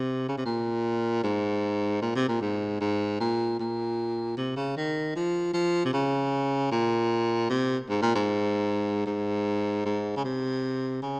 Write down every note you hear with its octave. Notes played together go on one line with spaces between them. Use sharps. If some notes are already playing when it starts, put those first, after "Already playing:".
Already playing: C3
C#3
C3
A#2
G#2
A#2
C3
A#2
G#2
G#2
A#2
A#2
C3
C#3
D#3
F3
F3
C3
C#3
A#2
C3
G#2
A#2
G#2
G#2
G#2
C#3
C3
C#3